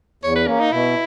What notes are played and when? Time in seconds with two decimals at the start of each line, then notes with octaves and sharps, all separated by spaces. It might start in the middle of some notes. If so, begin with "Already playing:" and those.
0.23 E2 C#5
0.36 B4
0.47 A#3 C#4
0.60 D#4
0.72 B2 E4